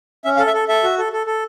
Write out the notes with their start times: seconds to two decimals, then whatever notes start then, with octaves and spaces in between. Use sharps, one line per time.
0.24 C#4 E5
0.36 F5
0.39 A4
0.47 E5
0.54 A4
0.68 A4 E5
0.83 F#4
0.98 A4
1.12 A4
1.27 A4